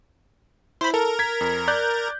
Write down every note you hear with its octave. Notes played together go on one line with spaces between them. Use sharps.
E4 C5 B5
A4 A#4
G#6 B6
F2
D5 F#6 G6